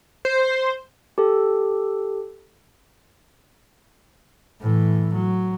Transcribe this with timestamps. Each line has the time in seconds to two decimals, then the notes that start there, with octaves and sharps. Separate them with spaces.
0.25 C5
1.18 G4 A4
4.60 A2 E3
5.13 F#3